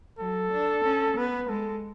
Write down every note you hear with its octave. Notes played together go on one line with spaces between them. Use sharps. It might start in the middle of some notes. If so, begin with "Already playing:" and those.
F#3 A4
D4
C#4
B3 B4
G#3 A4